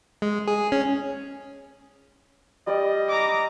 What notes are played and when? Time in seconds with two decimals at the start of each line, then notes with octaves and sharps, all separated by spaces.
0.22 G#3
0.48 G#4
0.72 C#4
2.67 G3 D5 D#5
3.09 A#5 D6